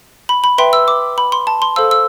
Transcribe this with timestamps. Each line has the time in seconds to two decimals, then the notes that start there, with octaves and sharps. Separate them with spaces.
0.29 B5
0.44 B5
0.58 B4 E5 G5 C6
0.73 E6
0.88 D6
1.18 B5
1.32 C6
1.47 A5
1.62 C6
1.76 A4 C5 F5 E6
1.91 E6